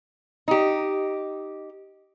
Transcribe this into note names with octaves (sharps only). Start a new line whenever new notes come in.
D#4 G4